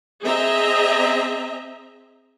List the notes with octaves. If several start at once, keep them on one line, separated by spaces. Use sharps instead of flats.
C4 G#4 D#5 E5 A#5